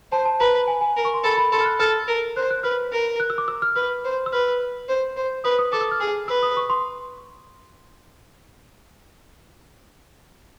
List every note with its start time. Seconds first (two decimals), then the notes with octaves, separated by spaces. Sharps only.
0.12 C5 A5
0.25 A5
0.40 B4 A#5
0.54 A#5
0.67 G#5
0.81 G#5
0.96 A#4
1.05 C#6
1.14 C6
1.24 A4 B5
1.37 B5
1.52 A4 C6
1.61 F6
1.65 F#6
1.79 A4 F6
2.08 A#4
2.36 C5 F#6
2.51 F#6
2.63 B4 F6
2.92 A#4
3.20 F#6
3.30 E6
3.38 D6
3.48 E6
3.62 F6
3.76 B4 F6
4.05 C5
4.26 E6
4.33 B4 F6
4.88 C5
5.17 C5
5.44 B4 D#6
5.59 D#6
5.72 A4 D6
5.81 E6
5.91 F6
6.01 G#4
6.28 B4 E6
6.43 D#6
6.57 C#6
6.70 C6